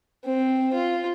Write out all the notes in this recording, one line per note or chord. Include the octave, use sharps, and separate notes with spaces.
C4
F4